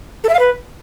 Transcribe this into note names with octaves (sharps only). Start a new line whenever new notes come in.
A4
E5
F5
B4